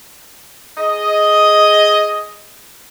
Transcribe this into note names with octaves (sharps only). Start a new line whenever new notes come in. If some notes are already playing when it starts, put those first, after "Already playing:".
G#4 D#5